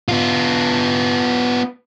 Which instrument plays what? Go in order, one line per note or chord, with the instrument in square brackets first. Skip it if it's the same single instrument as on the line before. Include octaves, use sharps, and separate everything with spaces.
[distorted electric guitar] B3 F4